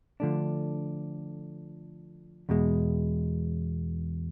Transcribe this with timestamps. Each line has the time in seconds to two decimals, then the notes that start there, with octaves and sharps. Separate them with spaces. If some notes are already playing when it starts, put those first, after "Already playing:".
0.20 D3 F3 A3 D4
2.49 E2 B2 G#3